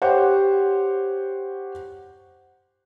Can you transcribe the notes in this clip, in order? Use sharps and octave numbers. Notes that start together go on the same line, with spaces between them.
G4 C5 C#5 F#5